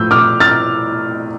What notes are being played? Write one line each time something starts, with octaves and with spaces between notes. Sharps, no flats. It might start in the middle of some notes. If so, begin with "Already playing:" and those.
Already playing: A2 F3 A3 E6 G6
D6 F6
F6 A6